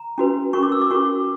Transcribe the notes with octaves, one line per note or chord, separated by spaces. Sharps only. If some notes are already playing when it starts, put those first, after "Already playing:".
Already playing: A#5
C#4 F#4 B4
C#4 F#4 A#4 C#6
D6
E6
D6
C#4 F#4 A#4 C#6